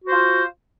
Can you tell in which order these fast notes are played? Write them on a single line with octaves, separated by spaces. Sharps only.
F#4 C5 F4